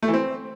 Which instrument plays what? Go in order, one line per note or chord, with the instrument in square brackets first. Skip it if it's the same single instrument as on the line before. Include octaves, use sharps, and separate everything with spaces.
[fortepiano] A3
E3
C4